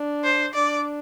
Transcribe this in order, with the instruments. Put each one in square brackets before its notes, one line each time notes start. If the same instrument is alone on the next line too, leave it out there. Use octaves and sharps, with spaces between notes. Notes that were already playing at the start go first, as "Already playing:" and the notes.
Already playing: [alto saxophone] D4
[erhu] C5
[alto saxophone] D4 [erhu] D5